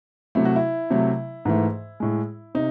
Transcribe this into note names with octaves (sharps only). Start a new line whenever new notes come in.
C3 F#3 A3 E4
F#4
E4
C3 F#3 A3
G#2 E3 A3
A2 G#3
C3 D#4